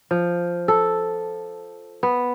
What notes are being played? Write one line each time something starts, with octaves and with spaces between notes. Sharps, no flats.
F3
A4
B3